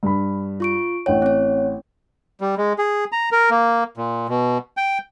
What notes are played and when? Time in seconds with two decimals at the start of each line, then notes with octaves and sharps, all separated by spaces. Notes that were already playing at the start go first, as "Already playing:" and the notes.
0.03 G2 B5
0.60 F4 C#6 D7
1.06 A1 C#5 F#5 G5
1.22 C4 C#5
2.41 G3
2.57 G#3
2.78 G#4
3.12 A#5
3.32 A#4
3.50 A#3
3.97 A#2
4.29 B2
4.77 G5